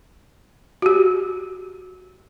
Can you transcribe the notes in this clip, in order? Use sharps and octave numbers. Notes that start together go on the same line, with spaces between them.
F#4 G4